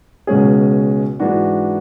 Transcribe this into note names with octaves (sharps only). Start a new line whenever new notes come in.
C#2 B2 G#3 C#4 G#4
G#2 E3 G#3 D4 F#4